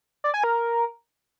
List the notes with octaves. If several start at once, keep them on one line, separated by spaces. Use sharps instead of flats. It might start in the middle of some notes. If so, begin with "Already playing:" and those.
D5
G#5
A#4